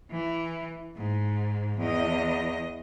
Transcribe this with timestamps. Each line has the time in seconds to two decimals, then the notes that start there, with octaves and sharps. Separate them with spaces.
0.11 E3
0.96 G#2
1.78 E2 D#5